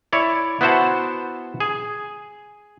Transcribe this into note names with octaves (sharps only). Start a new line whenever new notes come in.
E4 C#5 D5
B3 E4 F#4 C5 F#5 A5
G#4